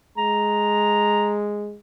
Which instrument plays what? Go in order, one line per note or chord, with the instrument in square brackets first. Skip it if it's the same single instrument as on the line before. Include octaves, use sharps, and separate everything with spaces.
[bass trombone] G#3 [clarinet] A#5